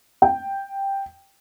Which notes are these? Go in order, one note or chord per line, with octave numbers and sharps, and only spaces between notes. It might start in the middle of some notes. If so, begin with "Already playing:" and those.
G5